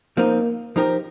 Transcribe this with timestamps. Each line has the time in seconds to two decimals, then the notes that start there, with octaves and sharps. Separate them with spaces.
0.17 F3 A#3 C4 D#4
0.76 F3 D#4 G4 A#4